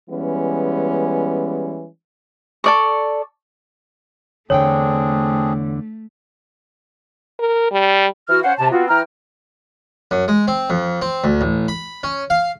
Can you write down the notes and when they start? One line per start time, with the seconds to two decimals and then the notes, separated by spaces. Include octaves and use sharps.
0.10 E3 G3 G#3 B3 C#4
2.64 A4 D5 C#6
4.50 E2 D3 A3 C4 D4 G#4 C#5 G5
7.39 A#4
7.71 G3
8.28 E3 F#4 F6
8.43 C#4 C5 F5 F#5
8.58 C3 A5
8.71 B3 C4 F4 F#4
8.88 E3 G5 A#5 F6
10.11 F#2
10.28 G#3
10.48 C4
10.70 F2
11.02 C4
11.24 D2
11.41 A1
11.68 B5
12.03 C#4
12.30 F5